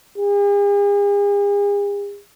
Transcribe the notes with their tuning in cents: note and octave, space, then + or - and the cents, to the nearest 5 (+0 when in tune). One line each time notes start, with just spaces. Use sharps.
G#4 -45